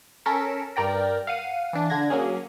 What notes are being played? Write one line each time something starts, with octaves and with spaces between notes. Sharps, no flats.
C#4 A4 A#4 B6 E7
G2 A#4 D5 G5 A#6
F5 F#5 D#7
E3 D4
D3 D4 G#6 A#6
F#3 A#3 C#4 G#4